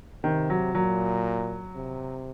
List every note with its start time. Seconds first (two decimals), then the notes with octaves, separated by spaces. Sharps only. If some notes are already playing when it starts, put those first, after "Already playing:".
0.24 C3 D#3
0.50 F#3
0.74 A#2 F#3
1.75 C3